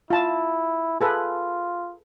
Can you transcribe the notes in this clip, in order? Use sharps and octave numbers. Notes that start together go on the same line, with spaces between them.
E4 F4 A5
F4 G#4 A4 B4